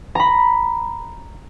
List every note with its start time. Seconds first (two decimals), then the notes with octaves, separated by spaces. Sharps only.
0.15 A#5 B5